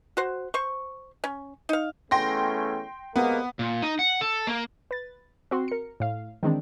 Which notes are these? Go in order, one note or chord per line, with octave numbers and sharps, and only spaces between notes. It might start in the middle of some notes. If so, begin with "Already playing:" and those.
F#4 C5
C5 C#6
C#4
D#4 F5
E2 A3 C#4 G5 C6 A#6
C3 G#3 A#3 B3
A#2
D#4
F#5
A4
A#3
B4 A6
C4 F#4 C6
A#4 C#7
A2 F5
D#3 E3 G#3 C4 D4